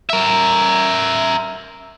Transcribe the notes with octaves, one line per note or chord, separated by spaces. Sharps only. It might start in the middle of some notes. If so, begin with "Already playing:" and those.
A#4 E5